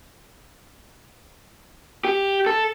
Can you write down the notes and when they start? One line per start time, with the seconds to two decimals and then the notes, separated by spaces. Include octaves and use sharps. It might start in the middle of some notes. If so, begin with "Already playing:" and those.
2.05 G4
2.46 A4